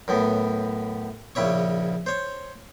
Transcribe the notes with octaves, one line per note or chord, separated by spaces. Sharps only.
F#2 A2 B3
A#1 C#3 E4 C#5 C#6
C5 C#5